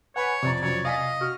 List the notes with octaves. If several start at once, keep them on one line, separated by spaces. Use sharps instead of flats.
B4 C#5 F#5 G#5 B5
F2 C3 D5 A#5 C#6
F2 F#3 C#5
D#5 F5 G#5 B6
F#4 F6